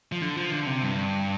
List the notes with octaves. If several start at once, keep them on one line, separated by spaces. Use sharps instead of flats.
F3
D3
F3
D3
C3
G2